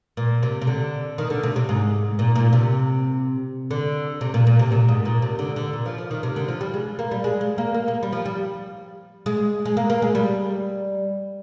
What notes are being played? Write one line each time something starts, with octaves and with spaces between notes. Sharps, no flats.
A#2
C3
C3
D3
D#3
D3
C3
C3
G#2
A#2
A#2
C3
D3
C3
A#2
A#2
C3
A#2
G#2
A#2
C3
D3
D3
A#2
F3
F3
D#3
C3
D3
F3
G3
G#3
A#3
G3
G#3
G#3
A#3
A#3
A#3
G3
F3
G3
G#3
G#3
A#3
A#3
G#3
G3